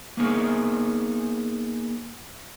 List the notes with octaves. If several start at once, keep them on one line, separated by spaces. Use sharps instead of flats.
A#3 B3 D#4 G#4 A#4 C5